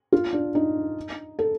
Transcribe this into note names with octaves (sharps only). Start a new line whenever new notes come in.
F4
D4
D#4
A4